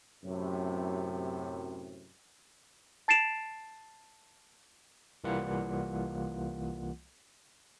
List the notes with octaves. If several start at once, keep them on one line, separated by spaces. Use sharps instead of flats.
F#2 A2 C3
A5 A6 C7 D7 E7 F7
C2 E3 G3 A#3 F4 F#5